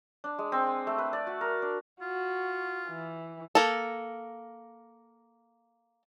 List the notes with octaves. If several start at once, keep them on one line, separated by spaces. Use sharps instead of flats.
D4
G#3
C4
G#5
A3
B4
D5
F#4
A#4
D4
F4 F#4
E3
A#3 A4